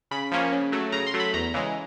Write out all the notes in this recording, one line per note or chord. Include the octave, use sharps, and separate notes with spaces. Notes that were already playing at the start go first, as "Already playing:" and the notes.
C#3 B5
F3 A#3 C#4
C#3
F#3 A3
C#3 A#5
C6
F#3 A3
B5
E2 A#5
C#3 E3 G#3